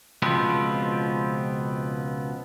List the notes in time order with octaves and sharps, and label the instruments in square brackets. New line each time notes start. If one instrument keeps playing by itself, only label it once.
[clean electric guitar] C#2 B2 F3 B3 C4